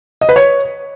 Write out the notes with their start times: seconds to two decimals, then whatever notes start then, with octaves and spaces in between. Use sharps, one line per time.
0.21 D#5
0.29 B4
0.36 C#5